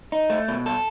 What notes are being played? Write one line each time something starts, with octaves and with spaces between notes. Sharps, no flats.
D#4
A3
B2
A4